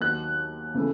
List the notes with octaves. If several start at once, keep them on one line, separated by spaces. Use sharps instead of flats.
D#2 D#3 F#3 F#6
C#3 E3 A3